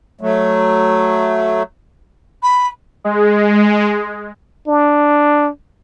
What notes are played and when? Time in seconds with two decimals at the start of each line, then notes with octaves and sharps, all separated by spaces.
0.21 F#3 A3
2.43 B5
3.04 G#3
4.68 D4